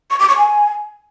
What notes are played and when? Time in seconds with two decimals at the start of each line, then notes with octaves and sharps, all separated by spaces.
0.10 C#6
0.20 D6
0.29 C#6
0.38 G#5